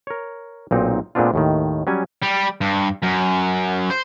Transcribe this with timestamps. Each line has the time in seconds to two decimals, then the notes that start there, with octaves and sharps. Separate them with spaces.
0.07 A#4 C#5
0.71 B1 A#2 C4 D#4
1.15 A#2 G#3 B3 C4 D4 F4
1.34 D#2 A2 D#3
1.87 F#3 G3 C#4 G#5
2.23 G3
2.61 G2
3.03 F#2
3.91 C5